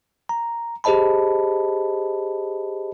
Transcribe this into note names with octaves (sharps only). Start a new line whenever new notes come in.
A#5
G4 G#4 C5 D#5 A5 B5